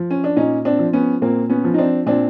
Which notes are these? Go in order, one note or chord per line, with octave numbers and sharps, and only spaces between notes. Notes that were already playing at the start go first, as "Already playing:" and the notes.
Already playing: F3
C#4
D4
A#2 C#4 D#4
C4 D4
F3
B3 C#4
A#2 A#3 C4
B3 C#4
F3
D#4
C4 D4
A#2 C4 D4